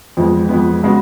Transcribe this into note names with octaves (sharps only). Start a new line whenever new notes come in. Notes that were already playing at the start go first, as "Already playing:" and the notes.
F2 F3 G#3 B3
F2 F3 G#3 B3
C#3 G#3 B3 F#4